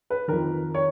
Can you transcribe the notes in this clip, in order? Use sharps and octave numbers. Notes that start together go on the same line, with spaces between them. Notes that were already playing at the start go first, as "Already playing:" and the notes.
B4
F2 D#3 A#4
C#5